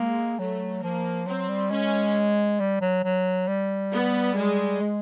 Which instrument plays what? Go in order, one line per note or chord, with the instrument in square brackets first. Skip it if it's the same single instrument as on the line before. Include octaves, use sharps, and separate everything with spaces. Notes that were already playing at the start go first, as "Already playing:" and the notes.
Already playing: [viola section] G#3 [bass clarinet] A#3
[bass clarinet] F#3 [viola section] A3
[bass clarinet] F3 [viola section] A#3
[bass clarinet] F#3 [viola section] C4
[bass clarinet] G3
[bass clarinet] G#3 [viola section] C#4
[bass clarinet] G3
F#3
F#3
G3
[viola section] B3
G#3
[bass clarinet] G#3